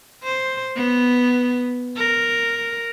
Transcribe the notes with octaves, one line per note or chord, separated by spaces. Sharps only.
C5
B3
A#4